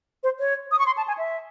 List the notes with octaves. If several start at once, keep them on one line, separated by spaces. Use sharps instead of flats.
C5
C#5
D#6
C#6
C6
A5
G#5
E5